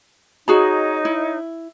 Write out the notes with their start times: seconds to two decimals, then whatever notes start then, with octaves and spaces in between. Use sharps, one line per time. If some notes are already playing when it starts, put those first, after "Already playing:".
0.48 D#4 F#4 G#4 C#5 D#5 A#5
1.05 E4